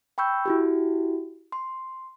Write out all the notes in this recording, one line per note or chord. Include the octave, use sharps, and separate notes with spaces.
G5 B5 C#6 E6 G6
E4 F#4 G4
C6